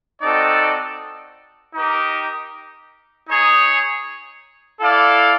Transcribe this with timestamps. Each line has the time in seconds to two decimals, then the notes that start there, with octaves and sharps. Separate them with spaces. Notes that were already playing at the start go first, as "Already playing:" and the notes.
0.21 C4 D#4 F#4 A4 D5
1.73 D#4 G4 A#4
3.26 D#4 G#4 C#5
4.80 E4 A4 D5 F5